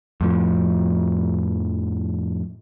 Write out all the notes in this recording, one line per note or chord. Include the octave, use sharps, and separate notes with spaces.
F2 A2 F3